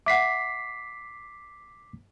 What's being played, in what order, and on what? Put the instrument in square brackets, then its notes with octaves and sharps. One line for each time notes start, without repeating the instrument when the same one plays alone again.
[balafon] E5 F#5 [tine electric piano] D6 B6 C7